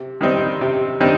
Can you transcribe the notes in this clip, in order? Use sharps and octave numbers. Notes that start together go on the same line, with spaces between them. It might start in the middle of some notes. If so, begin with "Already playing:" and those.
Already playing: C3
D#3 G3 C4 D#4
C3
D#3 G3 C4 D#4